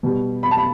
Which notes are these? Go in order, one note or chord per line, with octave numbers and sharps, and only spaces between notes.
B2 G3
B5
A5
B5